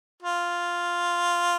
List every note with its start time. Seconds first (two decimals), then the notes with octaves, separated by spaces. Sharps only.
0.22 F4